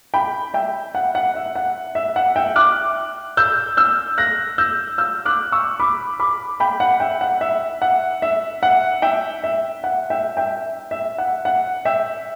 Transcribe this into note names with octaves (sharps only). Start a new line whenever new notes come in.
G5 B5
E5 G5
F#5
F#5
E5
F#5
E5
F#5
E5 G5
D6 F#6
E6 G6
E6 G6
F#6 A#6
E6 G6
E6 G6
D6 F#6
C#6 E6
B5 D6
B5 D6
G5 B5
F#5
E5 G5
F#5
E5
F#5
E5
F#5
E5 G5
E5
F#5
E5 G5
E5 G5
E5
F#5
F#5
E5 G5